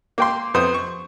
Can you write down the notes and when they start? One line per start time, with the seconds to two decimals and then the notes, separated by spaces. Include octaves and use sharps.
0.18 A#3 G5 C6
0.54 F2 B3 C5 D#6
0.74 C#6